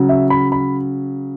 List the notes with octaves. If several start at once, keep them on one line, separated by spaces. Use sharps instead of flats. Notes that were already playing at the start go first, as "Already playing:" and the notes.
Already playing: C#3 F#3
E5
B5
B5